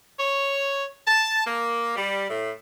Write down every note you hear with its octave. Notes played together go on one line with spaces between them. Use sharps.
C#5
A5
A#3
G3
A2